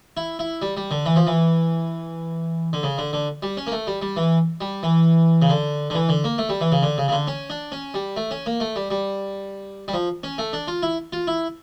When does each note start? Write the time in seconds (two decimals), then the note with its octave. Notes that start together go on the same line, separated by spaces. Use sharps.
0.17 E4
0.39 E4
0.62 G3
0.77 G3
0.91 D3
1.06 E3
1.16 F3
1.27 E3
2.73 D3
2.83 C#3
2.98 D3
3.13 D3
3.42 G3
3.57 C#4
3.67 A#3
3.72 A3
3.87 G3
4.02 G3
4.17 E3
4.61 G3
4.83 E3
5.42 C#3
5.50 D3
5.90 D3
5.95 E3
6.09 D3
6.24 A#3
6.38 A3
6.49 G3
6.61 E3
6.72 C#3
6.83 D3
6.98 C#3
7.08 C#3
7.12 D3
7.27 C#4
7.50 D4
7.72 C#4
7.94 G3
8.16 A3
8.31 C#4
8.46 A#3
8.60 A3
8.76 G3
8.90 G3
9.88 G3
9.94 F3
10.23 C#4
10.38 A3
10.53 D4
10.68 F4
10.83 E4
11.13 F4
11.27 E4